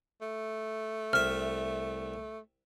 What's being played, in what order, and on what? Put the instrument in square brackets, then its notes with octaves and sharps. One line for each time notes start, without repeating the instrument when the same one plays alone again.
[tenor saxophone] A3
[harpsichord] C2 E5 [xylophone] F6